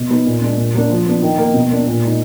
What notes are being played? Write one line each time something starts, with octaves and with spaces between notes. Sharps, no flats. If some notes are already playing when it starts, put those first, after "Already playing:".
Already playing: B2
F#3 B3 D#4
A#2
G#3 D4
A#2
F#3 A#3 D4
F3
B3 D4
D#3
A#3 D#4
B2
A#3 D4
A#2
G#3 D#4